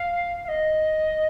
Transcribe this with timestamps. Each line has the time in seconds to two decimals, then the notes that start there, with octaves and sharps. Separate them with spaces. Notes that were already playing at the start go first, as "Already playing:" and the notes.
Already playing: F5
0.45 F5
0.48 D#5